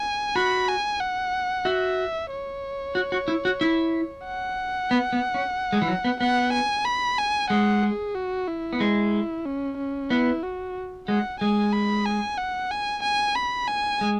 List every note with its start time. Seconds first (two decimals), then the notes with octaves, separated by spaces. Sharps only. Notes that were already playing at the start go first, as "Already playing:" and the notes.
Already playing: G#5
0.36 F#4 B5
0.68 G#5
1.00 F#5
1.65 F#4 E5
2.30 C#5
2.95 F#4
3.12 F#4
3.28 E4
3.45 F#4
3.61 E4
4.25 F#5
4.91 B3
5.13 B3
5.34 C#4
5.73 G#3
5.82 E3
5.88 F#3
6.04 B3
6.20 B3 F#5
6.53 G#5
6.85 B5
7.19 G#5
7.50 G#3 F#5
7.84 G#4
8.15 F#4
8.48 E4
8.73 B3
8.80 G#3 E4
9.45 C#4
9.78 C#4
10.10 B3 E4
10.43 F#4
11.08 G#3 F#5
11.40 G#3 G#5
11.73 B5
12.06 G#5
12.38 F#5
12.71 G#5
13.03 G#5
13.36 B5
13.68 G#5
14.01 G#3